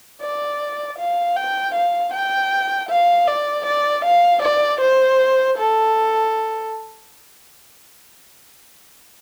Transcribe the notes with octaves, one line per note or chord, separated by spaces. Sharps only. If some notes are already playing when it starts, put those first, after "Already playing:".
D5
F5
G5
F5
G5
F5
D5
D5
F5
D5
C5
A4